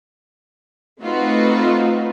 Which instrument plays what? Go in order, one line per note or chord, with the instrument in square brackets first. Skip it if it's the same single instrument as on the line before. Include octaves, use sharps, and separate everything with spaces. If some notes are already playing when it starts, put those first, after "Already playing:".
[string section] A3 C4 D#4 F4 F#4 B4